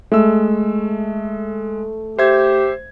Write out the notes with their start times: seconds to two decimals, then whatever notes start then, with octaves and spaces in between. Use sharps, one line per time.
0.12 G#3 A3 E6
2.19 G4 C5 E5 G#6